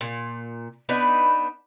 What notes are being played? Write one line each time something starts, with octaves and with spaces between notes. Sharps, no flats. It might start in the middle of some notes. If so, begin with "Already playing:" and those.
A#2
B3 D4 D#4 B4